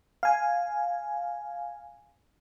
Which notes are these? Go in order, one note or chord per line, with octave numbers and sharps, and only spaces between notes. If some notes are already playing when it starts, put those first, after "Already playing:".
F5 G#5